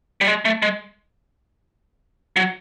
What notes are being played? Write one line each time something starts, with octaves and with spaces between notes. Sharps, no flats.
G3
G#3
A3
G#3
F#3